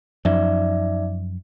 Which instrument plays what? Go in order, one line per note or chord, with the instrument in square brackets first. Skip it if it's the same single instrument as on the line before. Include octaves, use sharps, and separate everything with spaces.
[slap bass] F#2 F3 [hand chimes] D#4 D5 E5